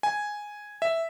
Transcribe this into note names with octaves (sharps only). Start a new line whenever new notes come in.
G#5
E5